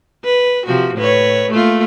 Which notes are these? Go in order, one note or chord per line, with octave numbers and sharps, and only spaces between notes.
B4
C3 F3 F#4
A2 B4 C#5
A3 A#3 F4